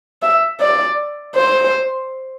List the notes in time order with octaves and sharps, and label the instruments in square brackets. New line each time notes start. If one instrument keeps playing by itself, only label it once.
[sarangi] E5
D5
C5